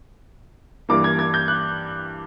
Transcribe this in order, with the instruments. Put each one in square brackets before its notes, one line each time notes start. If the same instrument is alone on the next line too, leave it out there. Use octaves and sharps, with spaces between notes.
[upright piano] G2 E3 G3 A#3 D6
G#6
G#6
G6
F#6